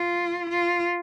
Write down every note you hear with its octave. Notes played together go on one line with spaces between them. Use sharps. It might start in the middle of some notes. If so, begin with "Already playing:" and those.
Already playing: F4
F4